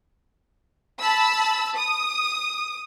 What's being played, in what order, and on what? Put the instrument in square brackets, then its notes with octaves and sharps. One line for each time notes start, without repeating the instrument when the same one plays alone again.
[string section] A5 B5 E6
D#6